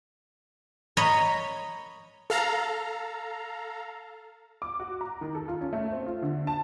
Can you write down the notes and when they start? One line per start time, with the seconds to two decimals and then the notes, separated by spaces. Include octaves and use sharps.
0.97 C#5 D#5 A#5 B5
2.30 A4 F5 A#5
4.62 D6
4.80 F#4
5.01 A#5
5.21 D#3
5.35 A4
5.48 F4
5.61 C#4
5.73 A3
5.92 C4
6.06 F4
6.23 D3
6.47 A5